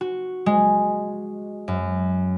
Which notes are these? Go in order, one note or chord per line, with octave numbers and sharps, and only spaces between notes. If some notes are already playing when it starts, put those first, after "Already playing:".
F#4
G#3
F#2